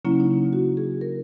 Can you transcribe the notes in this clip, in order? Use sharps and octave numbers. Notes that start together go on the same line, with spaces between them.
C#3 F#3 A#3 C#4 E4
D#4
F#4
G#4
A#4